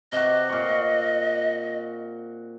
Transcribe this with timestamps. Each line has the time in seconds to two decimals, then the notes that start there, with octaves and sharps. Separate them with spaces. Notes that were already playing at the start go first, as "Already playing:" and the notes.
0.12 C3 F#4 D#5
0.49 A#2 C#6